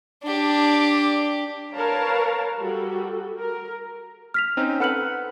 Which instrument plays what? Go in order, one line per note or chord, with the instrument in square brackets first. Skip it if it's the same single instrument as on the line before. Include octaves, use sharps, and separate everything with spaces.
[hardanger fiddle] D4 G4
[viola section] A#4 B4 C#5 F5 A5 A#5
G3 F#4 A4
A#4
[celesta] F6 B6 F7
[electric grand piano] C4 C#4 D#4
[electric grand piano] A4 B4 C#7 [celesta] F#5 F6 F#7